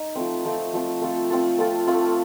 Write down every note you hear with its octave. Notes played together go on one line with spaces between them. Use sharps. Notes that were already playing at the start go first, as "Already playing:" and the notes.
Already playing: D#4
F3 A3 C4
F3 A3 C4
F3 A3 C4
A3 C4 F4 A4
A3 C4 F4 A4
A3 C4 F4 A4
A3 C4 F4 A4